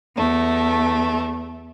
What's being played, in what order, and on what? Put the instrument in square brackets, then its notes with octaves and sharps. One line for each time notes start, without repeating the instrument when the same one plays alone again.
[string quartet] E2 A3